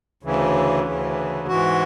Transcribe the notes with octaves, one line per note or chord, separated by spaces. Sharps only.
D2 C#3 E3
D2 C#3 E3
G#2 E3 F#4